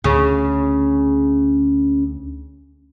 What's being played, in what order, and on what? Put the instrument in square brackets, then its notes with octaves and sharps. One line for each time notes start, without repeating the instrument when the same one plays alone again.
[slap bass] D2 [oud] C#3